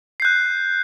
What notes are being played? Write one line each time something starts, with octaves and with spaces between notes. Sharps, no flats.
F#6 G6 C7